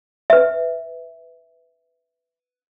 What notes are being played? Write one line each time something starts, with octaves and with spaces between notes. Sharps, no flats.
B4 E5